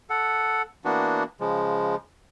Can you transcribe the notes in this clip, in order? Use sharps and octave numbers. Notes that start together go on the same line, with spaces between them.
A4 F#5
E3 A#3 B3 D4 F#4
C#3 F3 G#3